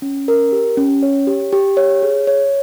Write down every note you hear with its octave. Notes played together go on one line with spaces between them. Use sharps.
C#4
A#4
G4
C#4
C#5
G4
G4
C#5
G#4
C#5